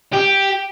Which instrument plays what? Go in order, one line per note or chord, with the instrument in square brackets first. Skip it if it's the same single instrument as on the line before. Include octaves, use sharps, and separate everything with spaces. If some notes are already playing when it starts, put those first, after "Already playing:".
[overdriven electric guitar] G4